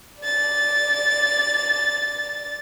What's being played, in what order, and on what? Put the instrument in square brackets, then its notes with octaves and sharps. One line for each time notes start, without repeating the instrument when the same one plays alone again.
[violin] D5 A6